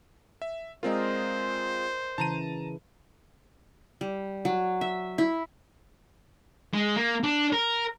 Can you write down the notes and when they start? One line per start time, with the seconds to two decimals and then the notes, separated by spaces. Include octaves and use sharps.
0.42 E5
0.83 G#3 C4 F4 A#4 C5 D5 D#5
2.18 C#3 E3 E4 A5 A#5 D#7
4.01 G3
4.45 F#3
4.81 E5
5.18 E4
6.74 G#3
6.96 A#3
7.23 D4
7.53 A#4